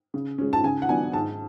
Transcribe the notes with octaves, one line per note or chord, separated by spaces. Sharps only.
C#3
G#3 C#4
A5
C#3 G#5
F#5
F#3 B3 D4 G#5
G#2 A5